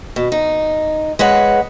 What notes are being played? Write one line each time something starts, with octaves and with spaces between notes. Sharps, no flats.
B2
D#4
G#3 B4 C#5 F#5